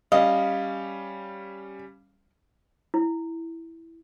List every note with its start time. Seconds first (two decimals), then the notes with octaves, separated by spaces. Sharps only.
0.12 G3 C#4 D#5 F5
2.94 E4